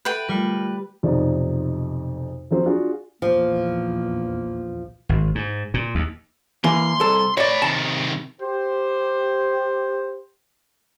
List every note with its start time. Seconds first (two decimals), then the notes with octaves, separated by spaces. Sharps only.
0.05 A4 B4 E5 F#5 G5
0.29 G3 A3 F4 A#4
1.03 B1 F2 C3 D#4 D5
2.51 F3 F#3 C4
2.65 D4 F4 F#4 G#4
3.22 A#1 E2 F3 A#3
5.09 G#1
5.35 G#2
5.74 A#2
5.95 D#2
6.64 E3 A#3 C6
7.00 C2 A4
7.37 B4 C#5 D5 A5
7.62 C3 D#3 A5
8.41 G4 C5